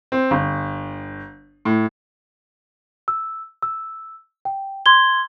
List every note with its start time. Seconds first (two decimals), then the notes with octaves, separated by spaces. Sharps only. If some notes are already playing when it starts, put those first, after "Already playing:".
0.12 C4
0.31 G1
1.65 A2
3.08 E6
3.62 E6
4.45 G5
4.86 C6 G#6 G7